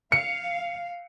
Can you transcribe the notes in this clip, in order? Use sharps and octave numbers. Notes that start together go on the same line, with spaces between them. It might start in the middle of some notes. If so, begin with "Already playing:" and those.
F5 C#7